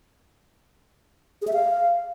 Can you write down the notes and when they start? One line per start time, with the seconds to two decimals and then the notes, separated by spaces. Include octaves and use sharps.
1.42 G#4
1.47 E5
1.53 F5